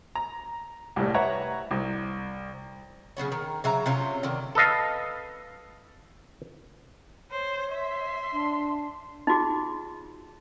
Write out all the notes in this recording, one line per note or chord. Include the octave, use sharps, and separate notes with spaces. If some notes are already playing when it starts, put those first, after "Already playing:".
A#5
C2 A2 G3
B4 C#5 E5 F#5 A#5 C#6
C2
C#3 F#3 B3 C#4
D#3
C#3 F#3 E5 A#5
C3 F#3 C#4 F4
D3 D#3
A4 B4 D#5 F5
C5 C#5
E5 C6
D4
D#4 F4 F#4 G#4